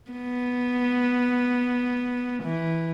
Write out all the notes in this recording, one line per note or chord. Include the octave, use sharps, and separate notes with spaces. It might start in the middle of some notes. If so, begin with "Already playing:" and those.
B3
E3